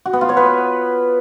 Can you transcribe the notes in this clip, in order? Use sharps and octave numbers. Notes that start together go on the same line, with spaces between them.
F#4
B3
F4
C#5
B4